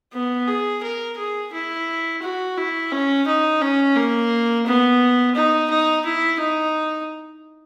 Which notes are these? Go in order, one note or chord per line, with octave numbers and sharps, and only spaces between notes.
B3
G#4
A#4
G#4
E4
F#4
E4
C#4
D#4
C#4
A#3
B3
D#4
D#4
E4
D#4